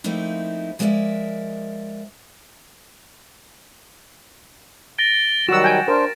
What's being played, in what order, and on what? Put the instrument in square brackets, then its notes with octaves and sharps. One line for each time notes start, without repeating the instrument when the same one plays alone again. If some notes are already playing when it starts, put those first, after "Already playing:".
[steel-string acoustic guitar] F3 A3 A#3 C4 D#4 E4
F3 G#3 A#4 C5 D5 E5
[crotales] A6 A#6 D7 [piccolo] G7
[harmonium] D#3 F#3 G3 [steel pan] F#4 E6 [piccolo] F#5 [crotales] E7
[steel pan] G5 G#5
[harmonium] D4 C5 [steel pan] A#4